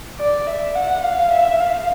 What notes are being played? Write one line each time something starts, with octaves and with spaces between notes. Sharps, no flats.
D5
E5
F#5
F5
E5
F5